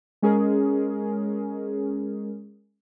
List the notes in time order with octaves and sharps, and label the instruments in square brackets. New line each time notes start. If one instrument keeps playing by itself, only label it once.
[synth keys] G#3 C#4 G#4 A#4